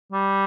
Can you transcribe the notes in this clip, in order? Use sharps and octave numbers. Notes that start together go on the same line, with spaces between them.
G3